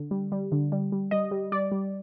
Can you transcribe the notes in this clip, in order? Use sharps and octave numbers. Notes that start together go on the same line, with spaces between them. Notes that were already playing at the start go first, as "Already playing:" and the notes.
Already playing: D3
G3
G3
D3
G3
G3
G3 D#5
G3
G3 D5
G3